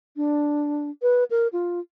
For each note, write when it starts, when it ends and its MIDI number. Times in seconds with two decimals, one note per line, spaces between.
0.16 0.90 62
1.02 1.24 71
1.31 1.48 70
1.53 1.80 65